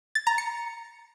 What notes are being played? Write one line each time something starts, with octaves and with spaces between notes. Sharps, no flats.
A6
A#5
C#7